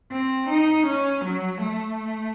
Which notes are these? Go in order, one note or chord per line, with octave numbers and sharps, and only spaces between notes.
C4
D#4
C#4
F#3
A3